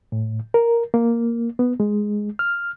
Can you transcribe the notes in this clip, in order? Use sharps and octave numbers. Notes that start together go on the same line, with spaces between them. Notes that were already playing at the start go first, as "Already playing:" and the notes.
A2
A#4
A#3
B3
G#3
F6